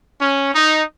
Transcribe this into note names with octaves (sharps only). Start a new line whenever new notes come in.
C#4
D#4